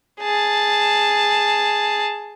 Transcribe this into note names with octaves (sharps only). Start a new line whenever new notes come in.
G#4 A5